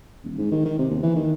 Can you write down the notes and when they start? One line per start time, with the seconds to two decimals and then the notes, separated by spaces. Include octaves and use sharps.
0.24 D#1
0.38 G#2
0.51 D#3
0.65 D#3
0.79 C3
0.90 D#2
1.03 E3
1.16 D#3